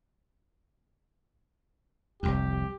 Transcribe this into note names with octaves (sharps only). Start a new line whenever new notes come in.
F1 C2 F2 G4